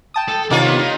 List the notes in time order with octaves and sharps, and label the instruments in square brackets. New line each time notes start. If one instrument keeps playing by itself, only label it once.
[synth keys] G5 A5 D#6
[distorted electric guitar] A4
[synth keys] C3 [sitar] D#3 F4 C#5 [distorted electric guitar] D5
[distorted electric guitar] B3
D#4